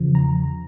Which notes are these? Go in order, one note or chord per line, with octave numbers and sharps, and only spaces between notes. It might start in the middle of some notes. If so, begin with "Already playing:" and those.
Already playing: E2 C#3 F3
A#5